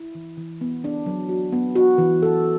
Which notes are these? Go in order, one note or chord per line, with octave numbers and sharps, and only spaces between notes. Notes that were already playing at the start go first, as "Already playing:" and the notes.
Already playing: E4
E3
E3
B3
D4
F#3
F#4
B3
F#4
E3
A4